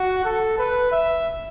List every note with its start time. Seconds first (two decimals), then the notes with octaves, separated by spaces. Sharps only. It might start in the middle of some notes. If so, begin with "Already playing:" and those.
Already playing: F#4
0.25 A4
0.58 B4
0.92 E5